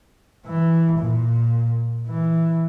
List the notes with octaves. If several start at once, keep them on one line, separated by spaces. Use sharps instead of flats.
E3
A#2
E3